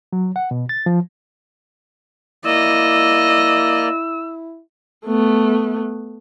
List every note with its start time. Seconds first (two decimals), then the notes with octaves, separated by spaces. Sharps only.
0.13 F#3
0.36 F#5
0.51 B2
0.69 A6
0.86 F3
2.45 A#3 E4 D5 D#5 E6
5.06 A3 B3